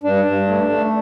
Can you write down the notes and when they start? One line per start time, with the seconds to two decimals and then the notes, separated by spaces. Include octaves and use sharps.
0.03 G2 D4
0.25 G2
0.47 A3
0.69 A3